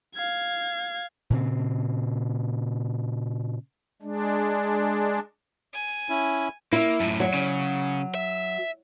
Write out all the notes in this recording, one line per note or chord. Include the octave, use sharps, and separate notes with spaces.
F5 G#6
A#2 C#3 C4
G#3 D4
G#5
C#4 E4
A#3 E4
F#2 A2
F#3
C#3
E5